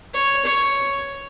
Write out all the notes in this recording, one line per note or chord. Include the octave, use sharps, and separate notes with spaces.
C#5
C#5